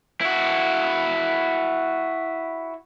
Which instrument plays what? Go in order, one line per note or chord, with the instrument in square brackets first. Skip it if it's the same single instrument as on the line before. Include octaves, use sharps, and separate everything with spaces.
[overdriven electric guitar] E4 F#4